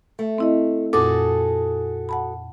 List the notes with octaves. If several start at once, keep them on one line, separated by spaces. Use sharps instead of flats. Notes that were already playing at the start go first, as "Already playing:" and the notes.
A3
C4 E4 D#5
F2 A#2 F#4 G#4 A4 D6
F#5 A5 B5